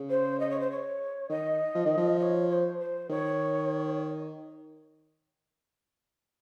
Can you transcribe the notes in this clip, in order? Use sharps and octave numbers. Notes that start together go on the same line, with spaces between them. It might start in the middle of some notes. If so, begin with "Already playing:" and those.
Already playing: C#3
C5
D#5
C#5
C5
C#5
D#3 D#5
F3
D#3
F3
D#5
C#5
C#5
C5
C5
D#3 C#5